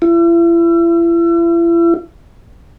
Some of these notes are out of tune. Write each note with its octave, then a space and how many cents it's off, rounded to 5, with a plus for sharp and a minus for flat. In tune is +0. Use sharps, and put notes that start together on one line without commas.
E4 +40